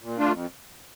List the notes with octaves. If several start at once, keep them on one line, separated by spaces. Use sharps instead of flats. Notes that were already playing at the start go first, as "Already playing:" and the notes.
A#2
A3 D4 F4
F2